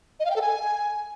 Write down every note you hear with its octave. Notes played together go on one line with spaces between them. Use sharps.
D#5
F5
G5
A4
G#5